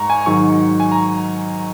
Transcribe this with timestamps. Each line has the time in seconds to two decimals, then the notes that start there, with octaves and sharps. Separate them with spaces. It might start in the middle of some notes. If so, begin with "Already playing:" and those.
Already playing: G#2 G#3 A#5 C#6
0.10 G#5
0.26 G#2 D#3 F#3 C#6
0.80 G#5
0.92 A#5